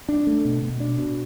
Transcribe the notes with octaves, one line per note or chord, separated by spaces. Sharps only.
D4
A3
B2
B2
D4
B2